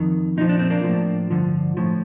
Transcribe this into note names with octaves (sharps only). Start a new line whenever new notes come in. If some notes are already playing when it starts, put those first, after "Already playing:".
Already playing: F2 D#3
A#2 F3 D#4
D4
C4
A#3 D4
A2 F3
G2 D3 F3
A2 F3